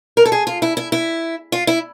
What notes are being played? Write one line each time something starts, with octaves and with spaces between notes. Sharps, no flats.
A#4
A4
G#4
F4
E4
E4
E4
F4
E4